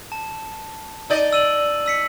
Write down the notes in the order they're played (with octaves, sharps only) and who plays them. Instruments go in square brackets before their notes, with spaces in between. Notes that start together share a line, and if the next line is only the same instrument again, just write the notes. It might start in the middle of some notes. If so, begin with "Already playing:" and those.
[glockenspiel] A5
[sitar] D#4 D5 D#5
[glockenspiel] E6 D#7 F#7
E6 B6 C#7